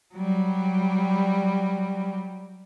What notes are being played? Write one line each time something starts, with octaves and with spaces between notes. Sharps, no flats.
F#3 G3